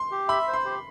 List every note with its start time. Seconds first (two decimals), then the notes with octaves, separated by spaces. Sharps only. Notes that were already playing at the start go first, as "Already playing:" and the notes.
Already playing: C6
0.11 G4
0.28 E5 B5
0.48 C5
0.54 C6
0.65 G4